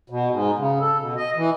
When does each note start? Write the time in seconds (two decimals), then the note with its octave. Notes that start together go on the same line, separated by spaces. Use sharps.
0.10 B2
0.31 G#2
0.58 C#3
0.80 A4
0.99 B2
1.17 D#5
1.36 E3